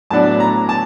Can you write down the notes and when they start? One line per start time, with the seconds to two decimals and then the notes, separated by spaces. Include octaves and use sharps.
0.10 A2 F#3 B3 D4 A5
0.40 A#5
0.69 A5